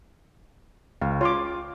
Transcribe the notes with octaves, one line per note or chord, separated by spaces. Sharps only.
C#2 F5
F4 C#5 C6 D6